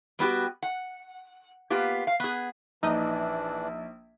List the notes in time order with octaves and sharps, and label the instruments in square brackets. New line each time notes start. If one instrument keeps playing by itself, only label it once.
[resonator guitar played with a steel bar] G3 B3 F#4 G4
F#5
A#3 B3 F4 G4
F5
B3 G#4
[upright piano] A#1 [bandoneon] E3 D4 [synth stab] D#4 D#5